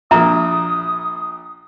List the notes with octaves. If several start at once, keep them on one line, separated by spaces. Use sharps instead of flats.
A#1 A#2 E5 A#5 D#6